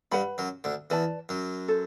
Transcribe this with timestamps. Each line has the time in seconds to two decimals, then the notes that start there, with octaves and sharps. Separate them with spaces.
0.12 G2 G3 B4 F#5 B5
0.38 F#2 F#3
0.64 D2 D3
0.90 E2 E3 B4 D5 A5
1.29 F#2 F#3
1.68 A4 C5